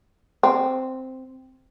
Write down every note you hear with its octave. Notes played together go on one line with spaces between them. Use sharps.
C4